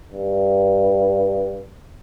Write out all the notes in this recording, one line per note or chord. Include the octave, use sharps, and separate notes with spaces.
G2